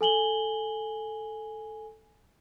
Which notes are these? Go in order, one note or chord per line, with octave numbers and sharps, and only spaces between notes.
A4 G#5 F#7 G7